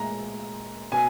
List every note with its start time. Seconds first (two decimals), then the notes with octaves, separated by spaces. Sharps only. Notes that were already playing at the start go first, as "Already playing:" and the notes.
Already playing: A#2 G#3 A#5
0.92 B2 G#5